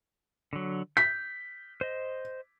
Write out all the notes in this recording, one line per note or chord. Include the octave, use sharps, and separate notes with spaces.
D3 F#3
G6 B6
C5 D#5